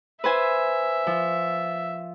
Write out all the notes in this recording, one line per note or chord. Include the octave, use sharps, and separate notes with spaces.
B4 C5 E5 G#5
F3